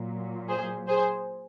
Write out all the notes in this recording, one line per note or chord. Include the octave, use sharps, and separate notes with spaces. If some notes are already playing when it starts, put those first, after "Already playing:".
Already playing: A#2 F#3
G#4 C5
G#4 C5